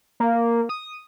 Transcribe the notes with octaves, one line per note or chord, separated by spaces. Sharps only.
A#3
D#6